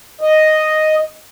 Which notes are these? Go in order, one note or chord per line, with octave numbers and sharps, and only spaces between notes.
D#5